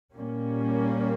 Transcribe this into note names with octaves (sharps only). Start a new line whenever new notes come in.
A#2 G3 A#3 C#4